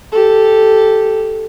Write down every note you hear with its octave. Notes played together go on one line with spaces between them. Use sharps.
G4 A4